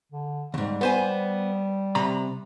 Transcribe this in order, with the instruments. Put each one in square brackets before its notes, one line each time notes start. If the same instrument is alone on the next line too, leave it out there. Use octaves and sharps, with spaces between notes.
[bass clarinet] D3
[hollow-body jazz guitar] D#2 G#2 [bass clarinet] G3
[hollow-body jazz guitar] B3 C5 G#5
C3 A#5 B5